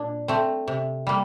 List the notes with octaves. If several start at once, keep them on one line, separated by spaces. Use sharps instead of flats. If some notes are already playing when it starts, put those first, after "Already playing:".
Already playing: A#2 D4
A3 C4
C3
G3 A#3